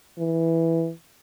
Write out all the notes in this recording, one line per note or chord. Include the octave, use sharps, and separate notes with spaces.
E3